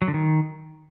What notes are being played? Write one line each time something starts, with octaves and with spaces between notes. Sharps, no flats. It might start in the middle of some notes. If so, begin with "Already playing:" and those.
F#3
D3
D#3